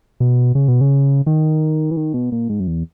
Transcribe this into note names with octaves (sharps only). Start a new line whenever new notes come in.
B2
C#3
B2
C#3
D#3
E3
D#3
B2
A#2
G#2
F#2
E2